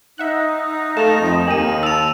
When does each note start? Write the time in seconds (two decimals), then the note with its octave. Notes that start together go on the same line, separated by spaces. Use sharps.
0.18 D#4 E5 F#5 F#6
0.97 A3 A4 F5 A5 E7 F7
1.20 F2
1.47 D#2 A#3 G4 G#5 D#7 F#7
1.83 A5 E6 F7